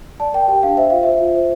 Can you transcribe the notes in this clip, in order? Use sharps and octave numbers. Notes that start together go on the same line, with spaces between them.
D5 A5
A#4 G5
G4 G5
D4 F5
C5 E5
F4 F5
C5 E5
F4
C5